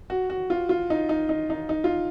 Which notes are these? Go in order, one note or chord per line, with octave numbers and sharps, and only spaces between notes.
F#4
F#4
F4
F4
D#4
D#4
D#4
D#4
D#4
F4